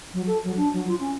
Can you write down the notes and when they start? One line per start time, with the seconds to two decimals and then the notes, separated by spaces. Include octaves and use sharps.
0.14 F#3
0.27 A4
0.44 F#3
0.57 D4
0.73 F#3
0.88 F4
1.00 C#4